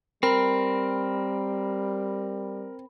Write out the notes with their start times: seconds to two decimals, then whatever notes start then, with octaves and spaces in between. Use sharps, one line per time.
0.23 G3 C4 A#4 B5